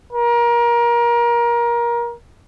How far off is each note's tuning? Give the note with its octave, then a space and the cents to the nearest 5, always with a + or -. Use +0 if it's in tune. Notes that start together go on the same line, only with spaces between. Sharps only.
A#4 +25